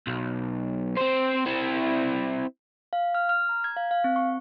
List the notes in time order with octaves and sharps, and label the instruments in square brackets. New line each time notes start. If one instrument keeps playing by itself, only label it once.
[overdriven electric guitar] B1
C4 C5
C4 E4
[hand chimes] F5
F6
F6
A#5
G#6
F5
F5
C4
C#6